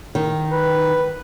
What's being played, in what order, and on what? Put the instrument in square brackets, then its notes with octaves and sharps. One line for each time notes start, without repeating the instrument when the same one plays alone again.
[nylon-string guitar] D#3
[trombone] B4